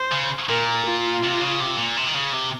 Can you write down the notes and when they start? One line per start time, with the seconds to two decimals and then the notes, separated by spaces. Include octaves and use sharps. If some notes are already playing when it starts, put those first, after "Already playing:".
Already playing: C5
0.12 C#3
0.49 A#2 A#4
0.86 F4
1.23 C3
1.41 C#3
1.60 C3
1.78 A#2
1.97 C3
2.07 D#3
2.16 C#3
2.33 C3